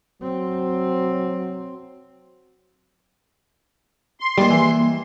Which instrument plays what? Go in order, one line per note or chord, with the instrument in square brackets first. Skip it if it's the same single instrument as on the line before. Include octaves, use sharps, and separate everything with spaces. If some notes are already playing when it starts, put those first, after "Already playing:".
[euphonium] F#3 [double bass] C4
[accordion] C6
[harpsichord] G#2 D#3 [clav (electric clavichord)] G3 [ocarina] A#3
[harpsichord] E3